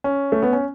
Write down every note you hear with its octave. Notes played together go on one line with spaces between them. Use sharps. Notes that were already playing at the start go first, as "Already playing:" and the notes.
C#4
A3
B3
C#4